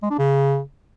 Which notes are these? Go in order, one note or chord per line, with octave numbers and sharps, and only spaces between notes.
G#3
D4
C#3